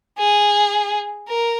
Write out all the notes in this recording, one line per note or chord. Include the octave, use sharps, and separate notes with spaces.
G#4
A#4